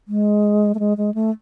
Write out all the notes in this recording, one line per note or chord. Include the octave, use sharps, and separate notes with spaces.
G#3
A3
G#3
G#3
A3